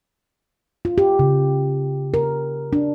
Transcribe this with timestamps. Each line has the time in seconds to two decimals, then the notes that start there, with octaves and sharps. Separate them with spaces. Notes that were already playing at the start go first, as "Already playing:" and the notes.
0.85 F4
0.98 G4
1.19 C#3
2.14 A#4
2.73 D4